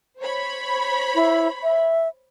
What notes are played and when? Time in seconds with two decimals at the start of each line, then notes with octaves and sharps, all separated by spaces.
0.20 C5 C#5 B5
1.15 E4
1.63 E5